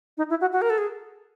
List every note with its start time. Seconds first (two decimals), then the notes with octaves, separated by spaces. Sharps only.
0.18 D#4
0.30 E4
0.41 F#4
0.53 F#4
0.62 A#4
0.70 A4
0.78 G#4